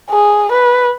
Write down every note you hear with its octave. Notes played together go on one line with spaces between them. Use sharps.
G#4
B4